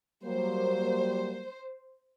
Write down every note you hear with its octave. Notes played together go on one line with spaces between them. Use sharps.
F#3 G3 A#3 C5